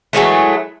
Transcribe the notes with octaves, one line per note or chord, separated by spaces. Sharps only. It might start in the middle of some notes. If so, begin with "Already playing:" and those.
E3 F#3 G#3 A3